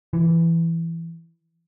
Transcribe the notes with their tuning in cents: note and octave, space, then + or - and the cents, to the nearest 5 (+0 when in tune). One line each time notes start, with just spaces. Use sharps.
E3 +10